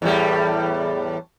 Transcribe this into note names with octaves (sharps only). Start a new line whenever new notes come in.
E2 A2 G3